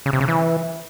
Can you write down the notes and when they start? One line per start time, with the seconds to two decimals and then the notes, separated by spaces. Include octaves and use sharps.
0.06 C#3
0.13 C3
0.21 C#3
0.28 E3